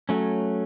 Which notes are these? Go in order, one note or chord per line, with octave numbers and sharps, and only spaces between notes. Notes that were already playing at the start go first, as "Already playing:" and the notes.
F#3 A3 C#4